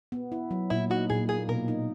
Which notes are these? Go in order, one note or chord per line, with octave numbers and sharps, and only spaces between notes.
B3
E4
F#3
A#2 E4
D#4 F#4
A#2 G#4
A#3 G#4
B2 A#4
D#4